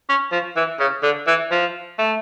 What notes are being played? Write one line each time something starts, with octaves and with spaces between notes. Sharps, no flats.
C#4
F3
E3
C#3
D3
E3
F3
A3